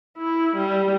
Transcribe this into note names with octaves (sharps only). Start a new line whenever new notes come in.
E4
G3